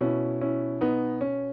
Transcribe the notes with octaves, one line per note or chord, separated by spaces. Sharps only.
B2 C#4 E4
C#4 E4
B3 D#4
C#4